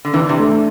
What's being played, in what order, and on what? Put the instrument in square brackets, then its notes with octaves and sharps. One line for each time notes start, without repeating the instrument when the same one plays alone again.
[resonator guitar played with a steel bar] D3
[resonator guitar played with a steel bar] C3 E3 [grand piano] D4
[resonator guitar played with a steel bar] C3 E3
[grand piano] A3